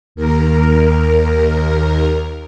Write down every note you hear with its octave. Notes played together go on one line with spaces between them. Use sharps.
D#2 A#4